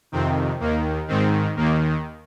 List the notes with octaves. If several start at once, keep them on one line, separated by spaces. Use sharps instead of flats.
F2 C3 D#3 C4
D#2 D#3 A#3
G#2 D#3 C4
D#2 D#3 A#3